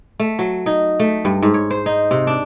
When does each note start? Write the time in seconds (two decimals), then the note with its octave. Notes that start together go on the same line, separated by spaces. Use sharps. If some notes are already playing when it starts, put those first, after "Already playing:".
0.20 A3
0.39 F#3
0.66 D#4
1.00 A3
1.25 G2
1.42 G#2
1.54 C#5
1.71 C5
1.86 D#4
2.11 C3
2.27 D4